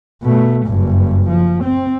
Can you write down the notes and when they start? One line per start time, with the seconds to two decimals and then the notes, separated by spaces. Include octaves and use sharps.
0.23 B2 A3
0.67 F#1 G2
1.29 F3
1.64 C4